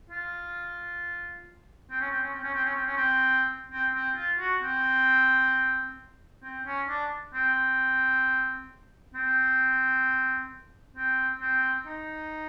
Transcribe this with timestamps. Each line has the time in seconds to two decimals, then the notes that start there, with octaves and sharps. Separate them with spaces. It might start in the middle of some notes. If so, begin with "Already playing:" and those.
0.10 F4
1.90 C4
2.01 C#4
2.11 C4
2.22 C#4
2.34 C4
2.43 C#4
2.54 C4
2.65 C#4
2.76 C4
2.86 C#4
2.97 C4
3.72 C4
3.95 C4
4.16 F4
4.40 F#4
4.62 C4
6.43 C4
6.66 C#4
6.89 D4
7.34 C4
9.15 C4
10.96 C4
11.41 C4
11.86 D#4